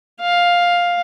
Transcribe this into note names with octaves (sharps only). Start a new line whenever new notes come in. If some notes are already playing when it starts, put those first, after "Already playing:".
F5